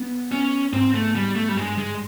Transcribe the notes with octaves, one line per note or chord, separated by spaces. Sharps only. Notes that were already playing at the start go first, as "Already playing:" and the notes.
Already playing: B3
B3 C#4
G#2 C4
A3
G#2 G3
A3
G3
G2 G#3
G#3